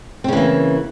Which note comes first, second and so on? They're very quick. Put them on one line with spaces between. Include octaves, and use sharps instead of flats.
C4 C#3 E3 A#3